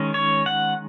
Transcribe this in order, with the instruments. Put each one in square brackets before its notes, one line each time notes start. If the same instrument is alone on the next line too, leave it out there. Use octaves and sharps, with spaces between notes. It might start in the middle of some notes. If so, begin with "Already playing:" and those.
Already playing: [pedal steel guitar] D#3 G#3 C#4
C#5
F#5